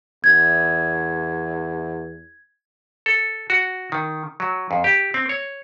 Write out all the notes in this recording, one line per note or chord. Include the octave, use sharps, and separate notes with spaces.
E2 G#6
A4
F#4
D#3
F#3
F2
G4
C4
C#5